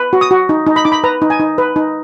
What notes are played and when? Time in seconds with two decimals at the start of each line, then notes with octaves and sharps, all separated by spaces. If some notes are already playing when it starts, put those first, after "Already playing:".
Already playing: B4
0.13 F#4
0.21 D#6
0.31 F#4
0.49 D#4
0.67 D#4
0.76 B5
0.85 D#4 D6
0.92 B5
1.04 B4 A#5
1.22 D#4
1.30 G#5
1.40 D#4
1.58 B4
1.76 D#4